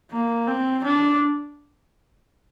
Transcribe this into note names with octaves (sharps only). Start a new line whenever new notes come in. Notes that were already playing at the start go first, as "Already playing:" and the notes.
A#3
C4
D4